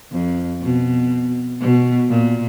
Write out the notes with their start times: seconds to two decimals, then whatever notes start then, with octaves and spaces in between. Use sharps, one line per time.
0.12 F2
0.62 B2
1.61 B2
2.09 A#2